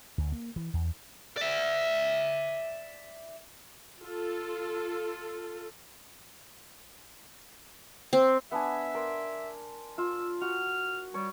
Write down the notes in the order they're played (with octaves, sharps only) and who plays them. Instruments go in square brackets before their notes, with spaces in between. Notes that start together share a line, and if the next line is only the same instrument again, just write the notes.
[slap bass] D2
A#3
E3
E2
[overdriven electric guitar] D5 E5
[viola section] F4 A4
[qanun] C4
[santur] B3 D4 G#5 [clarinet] E5
[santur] A#4 D5 C6
[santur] F4 [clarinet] E6
[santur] F#4 [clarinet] F6
[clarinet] G3 [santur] C#5